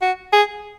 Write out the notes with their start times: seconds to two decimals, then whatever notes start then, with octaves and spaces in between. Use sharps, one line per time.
0.02 F#4
0.32 G#4